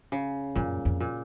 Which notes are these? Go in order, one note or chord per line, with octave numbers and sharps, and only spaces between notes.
C#3
F#2 A#2
F2
A#2